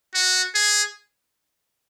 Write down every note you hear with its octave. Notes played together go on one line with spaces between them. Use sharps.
F#4
G#4